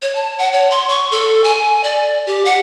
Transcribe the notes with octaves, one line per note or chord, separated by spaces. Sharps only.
C#5
A5
F#5
C#5
C6
C#6
A4
G#5
D5
G4
F#5